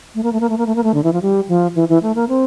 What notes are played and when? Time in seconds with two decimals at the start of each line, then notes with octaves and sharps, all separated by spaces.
0.15 A3
0.23 A#3
0.33 A3
0.40 A#3
0.50 A3
0.58 A#3
0.66 A3
0.76 A#3
0.83 A3
0.94 D3
1.04 E3
1.13 F3
1.22 G3
1.49 F3
1.75 E3
1.89 E3
2.03 A3
2.16 A#3
2.29 C4